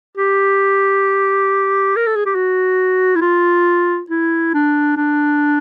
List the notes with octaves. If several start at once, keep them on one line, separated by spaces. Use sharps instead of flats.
G4
A#4
A4
G#4
G4
F#4
E4
F4
E4
D4
D4